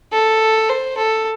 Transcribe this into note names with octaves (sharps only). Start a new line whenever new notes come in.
A4
C5
A4